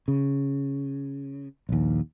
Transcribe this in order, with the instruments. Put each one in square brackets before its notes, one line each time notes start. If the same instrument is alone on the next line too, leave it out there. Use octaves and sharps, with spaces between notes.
[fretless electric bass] C#3
A#1 D#2